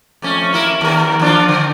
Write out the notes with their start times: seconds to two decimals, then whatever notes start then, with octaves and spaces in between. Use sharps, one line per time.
0.22 F2 A3 C#4
0.53 A#3 E4 A#4
0.81 D#2 A#4
1.20 F3 D4 F4
1.49 D3